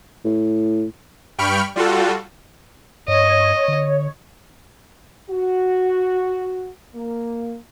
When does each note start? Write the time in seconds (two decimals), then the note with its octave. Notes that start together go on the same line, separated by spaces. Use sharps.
0.25 A2
1.38 G2 G5 B5 C#6 F6 D7
1.76 G3 F4 F#4 A4
3.08 G2 C#5 D#5
3.68 D3
5.29 F#4
6.94 A#3